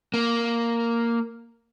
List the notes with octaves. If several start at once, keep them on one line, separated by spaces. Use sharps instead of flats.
A#3